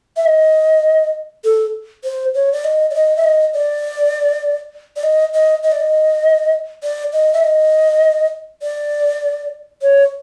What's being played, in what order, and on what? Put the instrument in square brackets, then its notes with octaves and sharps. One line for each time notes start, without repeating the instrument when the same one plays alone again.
[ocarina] E5
D#5
A4
C5
C#5
D5
D#5
D5
D#5
E5
D#5
D5
D5
D#5
D#5
D#5
D5
D#5
D5
D#5
E5
D#5
D5
C#5